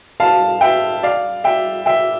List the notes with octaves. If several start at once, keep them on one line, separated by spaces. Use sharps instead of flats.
F5 A5
E5 G5
D5 F5
E5 G5
E5 G5